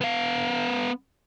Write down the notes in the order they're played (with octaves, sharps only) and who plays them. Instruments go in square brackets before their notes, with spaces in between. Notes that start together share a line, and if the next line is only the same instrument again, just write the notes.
[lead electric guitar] B3 F5